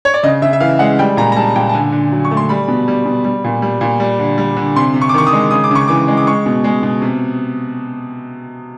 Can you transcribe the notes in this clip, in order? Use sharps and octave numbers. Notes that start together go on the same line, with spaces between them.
C#5
D5
C#3 D#5
C#3 E5
E5
E3 F5
G#3 F#5
G3 G5
A#2 A#5
A#5
G3 A5
A#2 G5
A5
D3 G#5
D3
F#3
C#6
A3
C6
G3 B5
B2
G3
B2
G3
A#2
G3
A#2
G3
D3
G3
D3
C3 C6
C3
C#6
D6
D#3 C#6
D#6
G#3
C#3 D#6
D6
C#3 C#6
E3 D6
G#3
D6
G#3 C#6
B2
G#3
B2
C3